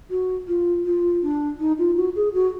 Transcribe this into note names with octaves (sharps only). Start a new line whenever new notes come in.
F#4
F4
F4
D4
D#4
F4
F#4
G#4
F#4